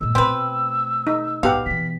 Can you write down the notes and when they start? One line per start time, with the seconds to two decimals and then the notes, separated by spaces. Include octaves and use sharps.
0.01 A#2 G#3 E6
0.15 B2 A3 C4 B4 G5
1.07 D#4
1.43 B1 G#2 B3 G4 F5 F#5
1.66 B2 E3 B6